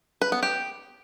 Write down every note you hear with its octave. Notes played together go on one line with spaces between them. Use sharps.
B4
B3
G4